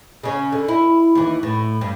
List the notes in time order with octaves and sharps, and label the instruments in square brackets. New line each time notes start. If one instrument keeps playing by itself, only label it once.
[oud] C#3 C#4
D3
E4
D#2 E3
A2
G2